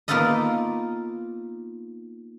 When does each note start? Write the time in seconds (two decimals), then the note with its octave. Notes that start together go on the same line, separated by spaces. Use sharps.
0.08 A#3 B3 D#4 F4 A4 D#5